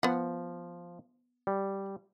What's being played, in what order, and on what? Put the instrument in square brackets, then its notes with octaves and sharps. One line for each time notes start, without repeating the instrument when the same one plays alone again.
[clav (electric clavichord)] F3 [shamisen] B3 F#5
[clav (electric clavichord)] G3